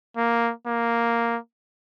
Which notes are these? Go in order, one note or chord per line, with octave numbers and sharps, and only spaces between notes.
A#3
A#3